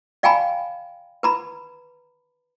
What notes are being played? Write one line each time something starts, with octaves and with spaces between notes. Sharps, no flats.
D5 F5 G5 G#5 A#5 B5
B4 A#5 B5